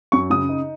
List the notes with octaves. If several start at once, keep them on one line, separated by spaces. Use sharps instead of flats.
F#2 C#6
C#3 D#6
D#4